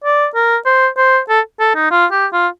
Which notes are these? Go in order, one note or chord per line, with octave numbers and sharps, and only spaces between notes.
D5
A#4
C5
C5
A4
A4
D#4
F4
G4
F4